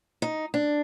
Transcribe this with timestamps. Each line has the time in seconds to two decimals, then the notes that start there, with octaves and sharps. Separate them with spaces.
0.22 D#4
0.54 D4